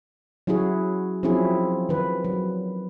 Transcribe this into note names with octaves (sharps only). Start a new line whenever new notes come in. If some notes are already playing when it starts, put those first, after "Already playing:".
F#3 C#4 E4 F#4 G#4
F3 F#3 C4 C#4 E4 G#4
D#3 B4
F#3